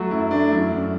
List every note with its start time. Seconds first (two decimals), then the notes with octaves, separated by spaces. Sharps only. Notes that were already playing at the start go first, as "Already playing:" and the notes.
Already playing: F#3 A3 F#4
0.11 F#2 E4
0.31 A3 D4
0.52 F#2 E4
0.71 F#2